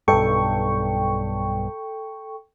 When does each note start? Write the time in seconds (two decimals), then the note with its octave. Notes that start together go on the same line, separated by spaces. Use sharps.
0.08 B1 G2 A4 G5 C#6